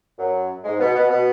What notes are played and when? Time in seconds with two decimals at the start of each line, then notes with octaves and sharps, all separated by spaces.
0.18 F#2 F#3
0.64 G#2 G#3
0.79 B2 B3
0.95 B2 B3
1.10 B2 B3